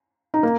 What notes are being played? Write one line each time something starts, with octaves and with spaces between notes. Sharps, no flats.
D#4
A#3